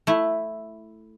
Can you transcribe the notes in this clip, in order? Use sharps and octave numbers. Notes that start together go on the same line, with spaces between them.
A3 E4